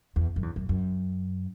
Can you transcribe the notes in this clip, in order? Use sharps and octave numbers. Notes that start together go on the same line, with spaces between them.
E2
F#2
E2
F#2
F#2